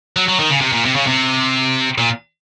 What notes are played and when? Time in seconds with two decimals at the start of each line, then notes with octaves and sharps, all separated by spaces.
0.16 F#3
0.28 F#3
0.39 D#3
0.50 C#3
0.61 C3
0.73 A#2
0.85 C3
0.95 C#3
1.07 C3
1.98 A#2